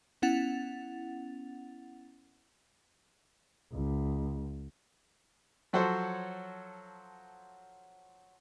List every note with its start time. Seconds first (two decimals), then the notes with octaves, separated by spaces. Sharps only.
0.22 B3 C#4 E4 F#5 A6 F7
3.73 C#2
5.73 F3 F#3 F#4 A4 C5 C#5